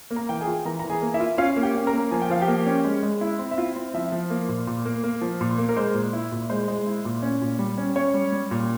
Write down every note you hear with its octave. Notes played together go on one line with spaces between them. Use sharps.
A#3
A#4 A#5
E3 G5
G#4 G#5
F4
E3 A#4 A#5
E3 A#5
G#4 G#5
A#3
E4 E5
F4
C#4 F4 F5
A#3
G4 G5
C#4
A#4 A#5
A#3
F3 G#5
G5
F3 F5
G4 G5
A#3
C#4
G#3
G#3
E4
C4
E5
E4 F4 F5
C4
F3 E4 E5
F3
A#3
A#2
A#2
A#3
A#3
F3
A#2
A#3
A#4
G#3 C5
A#2
E4
A#2
G#3 C5
G#3
E4
A#2
C#4
A#2
G3
C#4
C#4 C#5
G3
G3
A#2